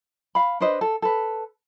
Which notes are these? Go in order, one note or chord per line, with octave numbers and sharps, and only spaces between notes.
F5 B5
D4 B4 C5 D#5
A4
A4 B4